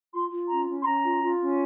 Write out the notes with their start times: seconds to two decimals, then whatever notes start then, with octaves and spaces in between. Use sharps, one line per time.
0.13 F4 C6
0.31 F4
0.49 C#4 A#5
0.67 C#4
0.81 C6
0.85 C#4 A#5
1.03 F4
1.22 F4
1.39 C#4